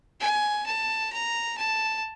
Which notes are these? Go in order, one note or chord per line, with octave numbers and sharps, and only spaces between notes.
G#5
A5
A#5
A5